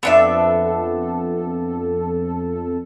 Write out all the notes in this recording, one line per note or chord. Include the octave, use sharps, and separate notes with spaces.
F2 B3 D4 A4 E5